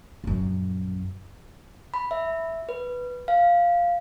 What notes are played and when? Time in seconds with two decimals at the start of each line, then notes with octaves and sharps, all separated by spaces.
0.24 A#1 F#2
1.94 B5
2.11 E5
2.69 B4
3.28 F5